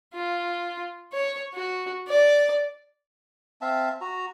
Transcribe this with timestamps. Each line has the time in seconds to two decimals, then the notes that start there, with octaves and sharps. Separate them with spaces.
0.14 F4
1.13 C#5
1.54 F#4
2.08 D5
3.61 C4 E5 F5 A5
4.01 F#4 A#5